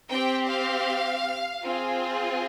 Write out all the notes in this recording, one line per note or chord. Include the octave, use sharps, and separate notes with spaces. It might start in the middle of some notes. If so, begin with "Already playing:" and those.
C4 G4 G5
F5
C4 F4 G#4